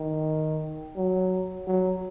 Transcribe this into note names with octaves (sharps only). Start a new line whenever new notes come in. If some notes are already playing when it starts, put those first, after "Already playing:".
Already playing: D#3
F#3
F#3